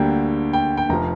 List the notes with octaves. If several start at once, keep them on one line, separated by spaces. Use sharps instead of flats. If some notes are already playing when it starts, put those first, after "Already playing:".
Already playing: D2 D3 G3 A#3 G5
G5
G5
F1 F3 A#5